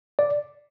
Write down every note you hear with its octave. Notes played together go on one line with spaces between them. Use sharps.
D5